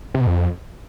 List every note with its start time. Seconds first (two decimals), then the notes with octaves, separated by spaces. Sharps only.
0.14 C3
0.21 B2
0.27 F2